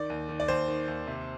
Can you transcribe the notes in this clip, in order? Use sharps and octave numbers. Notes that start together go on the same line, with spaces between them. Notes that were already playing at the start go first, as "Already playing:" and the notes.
Already playing: D#3 D5
D#2
D#3
D5
D#2 C5
D#3
D#2
C3